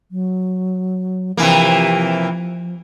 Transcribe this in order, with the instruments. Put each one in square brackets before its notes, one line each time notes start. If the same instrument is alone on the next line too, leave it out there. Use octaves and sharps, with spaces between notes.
[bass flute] F#3
[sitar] C3 E3 A#3 [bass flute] F3